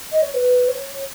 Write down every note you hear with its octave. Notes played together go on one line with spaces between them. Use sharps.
D#5
C#5
B4
C#5